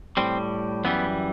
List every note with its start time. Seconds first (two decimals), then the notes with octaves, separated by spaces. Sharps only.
0.17 A2 G3 C4
0.85 F#2 E3 G3 B3